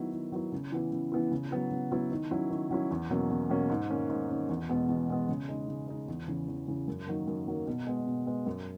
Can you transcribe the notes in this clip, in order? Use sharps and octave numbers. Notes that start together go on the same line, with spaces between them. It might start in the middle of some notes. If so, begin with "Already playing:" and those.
Already playing: D#3 F#3 B3 E4
D#3
F#3 B3 E4
C#3
E3 B3 E4
C#3
E3 B3 E4
C#3
F#3 B3 E4
C#3
F#3 B3 E4
D#3
F#3 C#4 E4
D#3
F#3 C#4 E4
E2
B2 F#3 A#3 C#4
E2
B2 F#3 A#3 C#4
G#2
D#3 A#3 C#4
G#2
D#3 A#3 C#4
E2
B2 G#3 B3
E2
B2 G#3 B3
C#3
G#3 D#4
C#3
G#3 D#4
E2
C#3 E3
E2
C#3 E3
F#2
D#3 F#3 A#3
F#2
D#3 F#3 A#3
B2
G#3 B3
B2
G#3 B3
F#2